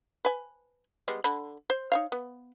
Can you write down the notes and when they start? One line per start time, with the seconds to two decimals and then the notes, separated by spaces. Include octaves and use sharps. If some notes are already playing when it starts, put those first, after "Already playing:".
0.25 B4 G#5
1.08 G3 G#3 B3
1.24 D3 B5
1.70 C5
1.92 D#4 C#5 F5
2.12 B3